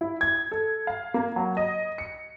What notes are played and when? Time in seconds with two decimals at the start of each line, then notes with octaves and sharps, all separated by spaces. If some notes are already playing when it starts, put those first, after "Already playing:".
0.01 E4
0.21 G#6
0.51 A4
0.87 F5
1.14 A#3
1.36 F#3
1.57 D#5
1.98 C#7